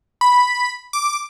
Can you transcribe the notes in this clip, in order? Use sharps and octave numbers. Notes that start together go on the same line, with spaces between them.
B5
D6